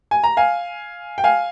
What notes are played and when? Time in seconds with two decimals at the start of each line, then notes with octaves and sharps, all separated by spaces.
0.11 G#5
0.24 A#5
0.37 F5 G#5
1.18 G5
1.24 F5 G#5